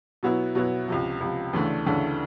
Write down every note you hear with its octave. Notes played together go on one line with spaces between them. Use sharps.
B2 F#3 B3 E4
B2 F#3 B3 E4
C#2 C3 F3
C#2 C3 F3
D2 C#3 E3 A3 D4
D2 C#3 E3 A3 D4